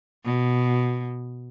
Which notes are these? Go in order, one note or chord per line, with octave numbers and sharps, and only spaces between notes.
B2